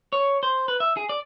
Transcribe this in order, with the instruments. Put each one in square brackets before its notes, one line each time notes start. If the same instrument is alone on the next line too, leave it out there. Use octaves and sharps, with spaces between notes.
[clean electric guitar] C#5
C5
B4
E5
G#4
D5